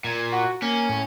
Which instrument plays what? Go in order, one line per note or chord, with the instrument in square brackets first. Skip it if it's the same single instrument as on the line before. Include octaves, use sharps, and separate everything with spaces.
[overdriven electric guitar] A#2 [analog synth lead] G#6
[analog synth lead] F#4
[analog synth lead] A#3 [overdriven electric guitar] C#4
[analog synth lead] A2